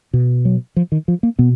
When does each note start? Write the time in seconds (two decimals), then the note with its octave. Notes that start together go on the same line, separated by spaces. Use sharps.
0.13 B2
0.45 F#3
0.76 F3
0.92 D#3
1.08 F3
1.23 A#3
1.39 B2 B3